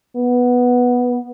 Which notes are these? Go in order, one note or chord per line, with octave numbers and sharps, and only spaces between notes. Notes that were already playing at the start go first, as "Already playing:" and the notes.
B3